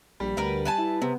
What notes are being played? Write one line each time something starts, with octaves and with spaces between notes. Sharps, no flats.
A#1 G3
D2 A#4 B4 F#5
B4 G#5 A5
E4
C3 B3